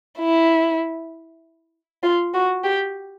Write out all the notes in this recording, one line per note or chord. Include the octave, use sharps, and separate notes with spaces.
E4
F4
F#4
G4